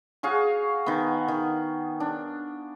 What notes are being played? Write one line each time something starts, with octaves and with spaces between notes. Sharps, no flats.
F#4 G#4 F5 C#6
D#3 B3
D#3
D4